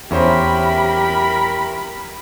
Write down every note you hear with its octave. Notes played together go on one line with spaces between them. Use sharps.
E2 C#4 E4 G4 A#4 C5 B5